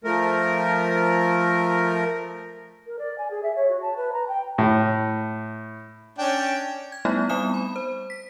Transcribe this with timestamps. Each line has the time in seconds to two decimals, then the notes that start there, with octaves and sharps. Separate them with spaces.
0.04 F3 A3 A#4
2.86 A#4
2.98 D5
3.18 G#5
3.30 G#4
3.43 E5
3.56 C#5
3.69 F#4
3.81 A5
3.96 B4
4.12 A#5
4.27 G5
4.58 A2
6.18 C#4 D4 G5
6.92 G#6
7.05 G3 A3 B3 D#4 E4
7.29 G3 B3 C4 G#5 D#6 E7
7.54 B5
7.76 C5
8.10 B6